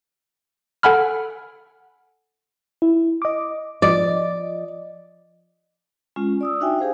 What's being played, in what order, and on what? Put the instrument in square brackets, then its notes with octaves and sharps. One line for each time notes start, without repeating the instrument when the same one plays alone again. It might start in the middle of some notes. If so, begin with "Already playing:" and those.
[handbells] A4 F#5 G#5 B5 F6
[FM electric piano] E4
D#5 D6
[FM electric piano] F3 D#5 [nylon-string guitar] D5
[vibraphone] G#3 C#4 F4
D5 D#6 E6
D4 D#4 F#4 E5 G5 G#5
G4 G#4 C5 F5